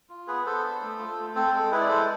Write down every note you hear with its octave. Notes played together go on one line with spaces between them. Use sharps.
F4
B3 G#4 B4
B3 A4 C5
D4
A3
F4
A3
C4 A4 C5
G#3 A4
E4 G#4 B4
D5
G#3 A4 C5